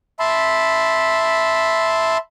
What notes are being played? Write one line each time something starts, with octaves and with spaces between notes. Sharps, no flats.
E5 A5 B5 C6